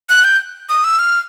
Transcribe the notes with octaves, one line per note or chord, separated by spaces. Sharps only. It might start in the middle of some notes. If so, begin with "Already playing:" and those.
F#6
G6
D#6
E6
F6